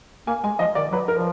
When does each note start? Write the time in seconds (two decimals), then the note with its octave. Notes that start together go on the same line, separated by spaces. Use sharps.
0.27 A#3 G#5
0.44 G#3 G#5
0.59 F3 D#5
0.75 D#3 D5
0.92 F#3 B4
1.08 F3 A#4